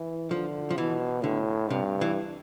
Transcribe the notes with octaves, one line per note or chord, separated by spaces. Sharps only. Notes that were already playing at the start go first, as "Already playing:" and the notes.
Already playing: E3
D3 F3
F3
B2 E3
A2 D3
G2 C3
E3